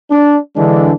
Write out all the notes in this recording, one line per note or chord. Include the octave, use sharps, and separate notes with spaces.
D4
D3 E3 G#3 D4